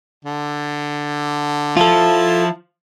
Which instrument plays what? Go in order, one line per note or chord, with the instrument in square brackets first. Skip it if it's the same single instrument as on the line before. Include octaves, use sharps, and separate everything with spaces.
[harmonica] D3
[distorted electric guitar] F3 [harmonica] E4 A5 [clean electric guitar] F4 A4